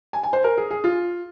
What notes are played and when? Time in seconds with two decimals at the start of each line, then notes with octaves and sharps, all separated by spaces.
0.13 G#5
0.23 G#5
0.33 C5
0.44 A#4
0.57 G#4
0.70 G#4
0.84 F4